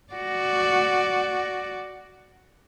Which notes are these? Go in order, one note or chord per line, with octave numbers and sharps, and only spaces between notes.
F#4 D5